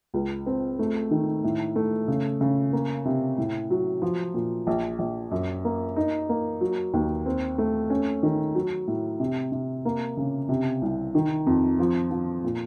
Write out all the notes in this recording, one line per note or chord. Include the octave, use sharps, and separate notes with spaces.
C#2
C4
A3
D#3
A2
A3
C#3
C#3
A#3
C3
A2
F#3
F3
A#2
A#1
A#1
F#2
A#3
D#4
A#3
F#3
D#2
C4
A3
C#4
D#3
F#3
A2
C3
C3
A#3
C#3
C3
C2
D#3
F2
F3
F3
A#2